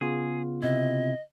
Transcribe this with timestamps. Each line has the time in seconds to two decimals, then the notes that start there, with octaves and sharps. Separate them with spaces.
0.01 C#3 B3 F4 G#4
0.62 C3 E4 D#5